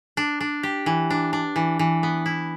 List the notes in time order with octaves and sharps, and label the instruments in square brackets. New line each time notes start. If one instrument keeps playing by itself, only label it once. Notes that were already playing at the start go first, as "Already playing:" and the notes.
[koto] D4
D4
G4
E3
D4
D4
E3
E3
B3
E4